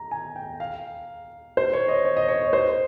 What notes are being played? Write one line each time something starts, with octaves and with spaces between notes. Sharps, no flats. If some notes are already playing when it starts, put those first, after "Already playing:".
Already playing: A#5
G#5
G5
F5
C5
C#5
D#5
C#5
D#5
C#5
C5